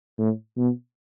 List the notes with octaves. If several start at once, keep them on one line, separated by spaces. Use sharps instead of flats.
A2
B2